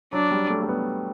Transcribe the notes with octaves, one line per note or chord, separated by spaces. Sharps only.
F#3 D4
G3
A3
A3
B3